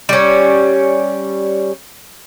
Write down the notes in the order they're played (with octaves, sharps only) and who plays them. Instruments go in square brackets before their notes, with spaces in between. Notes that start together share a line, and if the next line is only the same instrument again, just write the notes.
[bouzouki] G3 C#4